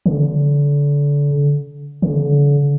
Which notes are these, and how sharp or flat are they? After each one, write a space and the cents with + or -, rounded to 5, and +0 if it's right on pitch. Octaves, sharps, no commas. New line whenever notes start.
D3 -30
D3 -40